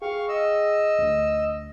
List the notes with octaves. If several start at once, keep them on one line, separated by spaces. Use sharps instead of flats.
G#4 F5 G5 C#6
D#5 E6
D2